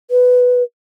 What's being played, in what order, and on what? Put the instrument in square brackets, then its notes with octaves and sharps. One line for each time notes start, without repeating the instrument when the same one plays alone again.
[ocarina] B4